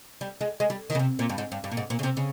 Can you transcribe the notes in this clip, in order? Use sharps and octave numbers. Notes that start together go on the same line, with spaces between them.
G3
G#3
G#3
G3
D#3
C#3
C3
A#2
G2
G#2
G2
G2
A#2
G#2
A#2
C#3
C3
C#3